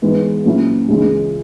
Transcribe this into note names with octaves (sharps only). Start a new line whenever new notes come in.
G#2 E3 G#3 B3
A#2 F#3 C#4 E4
C#2 C#3 E3 G#3 C#4